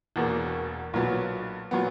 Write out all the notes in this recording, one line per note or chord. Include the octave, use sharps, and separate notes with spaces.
E1 E2 B2 A#3
B1 A#2 F#3 B3
A#2 F#3 B3